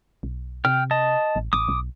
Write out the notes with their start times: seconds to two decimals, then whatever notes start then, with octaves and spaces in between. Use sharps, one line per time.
0.23 B1
0.65 C3 G5 F6
0.91 D#5 A5
1.36 A1
1.53 A1 D6 D#6
1.68 B1